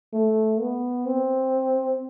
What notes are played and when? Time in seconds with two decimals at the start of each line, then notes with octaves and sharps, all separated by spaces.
0.13 A3
0.60 B3
1.06 C4